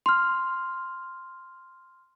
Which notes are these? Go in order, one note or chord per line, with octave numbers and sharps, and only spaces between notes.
C6 F6